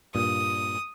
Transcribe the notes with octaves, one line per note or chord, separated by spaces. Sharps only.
G2 A#2 D#6